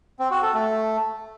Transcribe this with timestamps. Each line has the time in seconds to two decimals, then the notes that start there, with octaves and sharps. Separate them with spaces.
0.19 C4
0.31 F#4
0.42 A4
0.54 A3